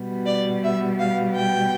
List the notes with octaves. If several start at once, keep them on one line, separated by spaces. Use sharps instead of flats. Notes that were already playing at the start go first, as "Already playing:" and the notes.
Already playing: B2 G3 B3
D5
E5
F5
G5